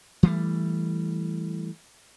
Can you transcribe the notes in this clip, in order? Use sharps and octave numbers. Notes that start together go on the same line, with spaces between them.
E3 G3 A3